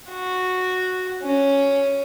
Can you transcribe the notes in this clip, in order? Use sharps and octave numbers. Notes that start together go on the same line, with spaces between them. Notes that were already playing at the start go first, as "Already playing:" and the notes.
F#4
C#4